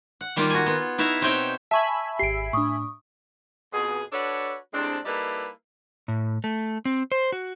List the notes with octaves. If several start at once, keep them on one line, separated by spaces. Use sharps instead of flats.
F#5
D#3 G3 A#3 F4
F#4 G#5
B3 F4
D#4 E4 F#4 E5 F5
B2 C4 D#4 C#5 E5 G5
E5 G#5 A5 B5 C#6
G#1 G4 C7 D7
A2 D4 C#6 D#6
F2 B2 G#4
D4 F#4 A4 B4 C#5
A2 C3 G#3 C4 D4
G3 A#3 D#4 E4 A4 B4
A2
A3
C4
C5
F#4